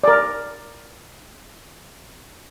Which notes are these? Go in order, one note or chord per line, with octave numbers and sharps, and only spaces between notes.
A#4 D5